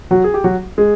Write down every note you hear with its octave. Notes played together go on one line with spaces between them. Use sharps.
F#3 F#4
G#4
G4
F#3 F#4
G#3 G#4